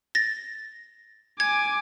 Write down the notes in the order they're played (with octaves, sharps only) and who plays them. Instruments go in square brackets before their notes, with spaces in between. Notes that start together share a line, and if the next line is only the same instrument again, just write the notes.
[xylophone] A6 A#6
[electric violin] G#5 D6 [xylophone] G#6